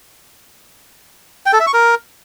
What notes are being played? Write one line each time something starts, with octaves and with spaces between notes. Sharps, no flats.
G5
A4
E5
C#6
A#4